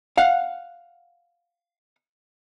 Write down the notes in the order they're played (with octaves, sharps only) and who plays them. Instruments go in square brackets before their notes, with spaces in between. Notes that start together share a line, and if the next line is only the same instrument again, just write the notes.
[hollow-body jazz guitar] F5 F#5